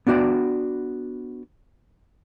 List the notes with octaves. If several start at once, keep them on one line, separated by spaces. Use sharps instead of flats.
B3 D4 F#4 D5 G5